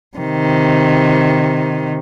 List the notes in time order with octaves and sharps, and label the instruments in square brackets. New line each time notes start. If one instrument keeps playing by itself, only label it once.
[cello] C3 D#3